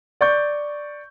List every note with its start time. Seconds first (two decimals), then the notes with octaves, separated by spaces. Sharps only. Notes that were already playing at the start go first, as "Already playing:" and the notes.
0.21 D5 C#6 G6